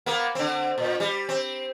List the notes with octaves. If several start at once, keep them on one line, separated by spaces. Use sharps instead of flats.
A#3 B3
D3 C4
A#2
G3
C4